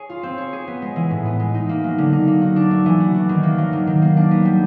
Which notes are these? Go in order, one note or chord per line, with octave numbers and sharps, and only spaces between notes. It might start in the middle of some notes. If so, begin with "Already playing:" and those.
Already playing: G#4 C#5
F4
C4
C#5
G#4
B3
G#3
E3
A2
B3
G#3
D#4
A#3
F#3
D3
D#4
A#3
F#4
D4
A3
E3
F#4
D4
D#3
A#3
F#3
D#3
D#3
A#3
D4
B3
G3